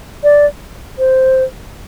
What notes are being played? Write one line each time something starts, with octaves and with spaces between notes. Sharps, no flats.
D5
C5